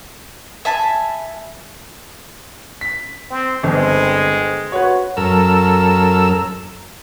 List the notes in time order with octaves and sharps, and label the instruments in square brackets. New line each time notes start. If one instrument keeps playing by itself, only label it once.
[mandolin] E5 G#5 A5 B5
[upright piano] B6
[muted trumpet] C4
[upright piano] G1 [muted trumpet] G#3 [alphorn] C4
[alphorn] F#4 [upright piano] B4 C#5
[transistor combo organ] F#2 A4 A#4 E6